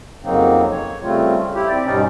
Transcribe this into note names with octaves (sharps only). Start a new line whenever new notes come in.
F2 C#3 F#3 A#3 C4 D#4
C#5
C#3 G3 A3 C4 F4
E4 G4
C4 D5
G2 B2 G3 C#4 D#4